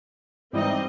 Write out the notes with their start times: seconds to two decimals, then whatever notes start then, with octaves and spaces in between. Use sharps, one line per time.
0.53 G#2 E3 G3 C4 D#4 D#5